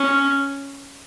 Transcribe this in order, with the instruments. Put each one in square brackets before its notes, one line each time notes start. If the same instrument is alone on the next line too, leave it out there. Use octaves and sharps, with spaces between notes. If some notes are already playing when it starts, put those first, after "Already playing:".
Already playing: [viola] C#4